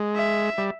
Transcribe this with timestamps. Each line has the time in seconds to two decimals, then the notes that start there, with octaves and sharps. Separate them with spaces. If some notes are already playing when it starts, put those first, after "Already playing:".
Already playing: G#3
0.16 E5
0.58 G3